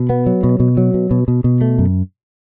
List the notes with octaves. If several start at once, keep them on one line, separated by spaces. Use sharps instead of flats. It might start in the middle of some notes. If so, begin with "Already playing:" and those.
Already playing: B2
B3
F#3
B2
B2
F#3
B2
B2
B2
B2
A3
F#2